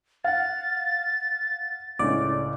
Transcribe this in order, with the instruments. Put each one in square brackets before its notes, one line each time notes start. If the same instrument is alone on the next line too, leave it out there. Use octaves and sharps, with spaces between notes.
[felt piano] F5 F#5 [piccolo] A6
[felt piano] C#2 A2 C#4 [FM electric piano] D5